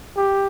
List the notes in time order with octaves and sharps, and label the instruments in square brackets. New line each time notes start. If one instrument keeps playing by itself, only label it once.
[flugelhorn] G4